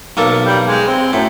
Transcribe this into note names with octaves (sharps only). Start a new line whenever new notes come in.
B1 A#3 A4
G3
G#3
C4
F#2 A2